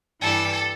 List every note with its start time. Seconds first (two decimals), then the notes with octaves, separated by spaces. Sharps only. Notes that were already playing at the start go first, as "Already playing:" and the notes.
0.21 G2 E3 G3 A4